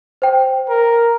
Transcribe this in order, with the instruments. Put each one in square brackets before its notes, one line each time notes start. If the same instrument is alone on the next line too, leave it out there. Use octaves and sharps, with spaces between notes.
[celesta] C5 G5
[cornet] A#4